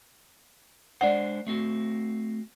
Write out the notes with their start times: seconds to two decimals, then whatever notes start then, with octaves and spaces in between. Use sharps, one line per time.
1.01 G#3 D4 C5 D5 F#5
1.47 A3 C4 F#4